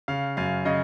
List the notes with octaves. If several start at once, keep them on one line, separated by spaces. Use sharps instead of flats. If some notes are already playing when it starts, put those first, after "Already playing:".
C#3 F5
F#2 F5
C#3 D#5